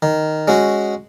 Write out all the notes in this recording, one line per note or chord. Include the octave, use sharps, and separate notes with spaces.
D#3
G#3 C#4 F#4